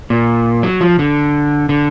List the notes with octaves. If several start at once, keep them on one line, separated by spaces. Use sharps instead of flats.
A#2
F#3
F3
D3
D3